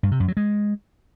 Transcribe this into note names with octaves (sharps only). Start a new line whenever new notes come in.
G2
C3
F#2
F#3
G#3